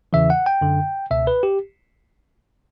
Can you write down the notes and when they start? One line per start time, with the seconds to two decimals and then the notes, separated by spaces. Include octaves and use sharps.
0.13 E2 C#3 E3 E5
0.30 F#5
0.46 G5
0.61 F#2 D3
1.11 C#2 B2 E5
1.27 B4
1.43 G4